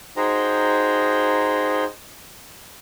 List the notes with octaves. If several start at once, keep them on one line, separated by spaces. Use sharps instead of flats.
D#4 F#4 G#4 C5 G5 A#5